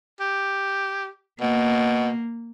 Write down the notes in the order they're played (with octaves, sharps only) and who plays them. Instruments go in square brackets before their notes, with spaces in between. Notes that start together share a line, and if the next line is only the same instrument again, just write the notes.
[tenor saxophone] G4
[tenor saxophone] B2 [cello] A#3